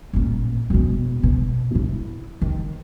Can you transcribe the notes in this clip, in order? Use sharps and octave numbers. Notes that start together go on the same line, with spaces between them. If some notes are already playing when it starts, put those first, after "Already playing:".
A1 A#2
E1 B2
B2
E4
D#3